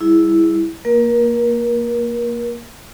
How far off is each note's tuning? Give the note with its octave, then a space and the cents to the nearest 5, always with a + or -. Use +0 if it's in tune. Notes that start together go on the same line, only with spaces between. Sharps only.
G3 +0 E4 +0 G#4 +0
A#3 +0 A#4 +35